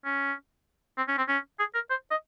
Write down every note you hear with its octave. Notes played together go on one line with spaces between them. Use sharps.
C#4
C4
C#4
C4
C#4
G#4
A#4
C5
D#5